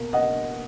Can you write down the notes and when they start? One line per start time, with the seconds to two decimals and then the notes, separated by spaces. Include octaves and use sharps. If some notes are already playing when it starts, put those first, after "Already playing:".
Already playing: B2 A#3
0.13 D#5 F#5